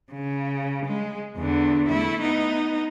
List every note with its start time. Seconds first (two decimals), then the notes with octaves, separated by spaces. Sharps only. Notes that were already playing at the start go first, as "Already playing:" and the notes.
0.12 C#3
0.86 G#3
1.37 E2 D3
1.88 A3 E4
2.21 B3 D#4